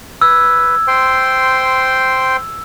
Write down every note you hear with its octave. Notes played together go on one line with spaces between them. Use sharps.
B4 E6 G#6
C5 G5 C6